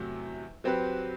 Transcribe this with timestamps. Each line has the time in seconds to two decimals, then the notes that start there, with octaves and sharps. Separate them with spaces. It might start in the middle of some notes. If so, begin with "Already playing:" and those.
Already playing: E2 C3 F#3 A3
0.64 F#3 C4 G4 B4